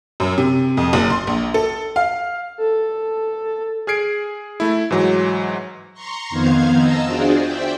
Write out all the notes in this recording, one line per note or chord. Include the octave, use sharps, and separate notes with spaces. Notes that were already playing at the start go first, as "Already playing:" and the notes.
F#2
C3
F2
F#1
C6
A#1
A4
F5
A4
G#4 F6 G#6 C7 D7
A3 E4
G#2 E3 F#3
A#5 C6 C#6
F2 D#3 B3 C5 F5 G#6
D#5 A5 A#5 E6
D4 F4 F#4 G#4 C5 D5
C5 D5 E5 G5